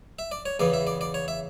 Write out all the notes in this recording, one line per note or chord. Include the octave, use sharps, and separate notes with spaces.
E5
D5
C#5
E2 C#3 E3 B3 D5
E5
D5
D5
C#5
E5